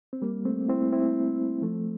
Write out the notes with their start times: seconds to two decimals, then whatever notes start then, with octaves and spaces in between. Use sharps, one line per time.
0.13 C4
0.22 G3 A#3
0.45 A3 C4
0.68 C4 E4
0.93 C4 E4
1.62 F3 A3